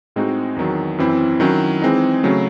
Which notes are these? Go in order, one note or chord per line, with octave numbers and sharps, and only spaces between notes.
A2 G#3 C4 D#4 F#4
E2 D#3 F#3
F#2 E3 C4 E4
D#3 F#3 C#4 E4
E3 G#3 C4 D#4
C#3 F#3 A3